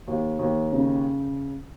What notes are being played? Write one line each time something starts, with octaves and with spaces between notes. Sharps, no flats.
D#2
D#2
C#3